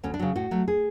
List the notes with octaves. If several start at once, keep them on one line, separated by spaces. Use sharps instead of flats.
D2 C#4
D4
C#3 F#3
A2 F#4
F#3 A3
G#4